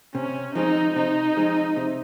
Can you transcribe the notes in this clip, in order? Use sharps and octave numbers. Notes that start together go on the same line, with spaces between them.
C3 C#4
F3 G#3 C4 D#4
C3 D#4
F3 G#3 C4
C3